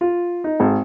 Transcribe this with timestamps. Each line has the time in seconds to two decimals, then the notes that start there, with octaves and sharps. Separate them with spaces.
0.01 F4
0.44 D#4
0.60 G#1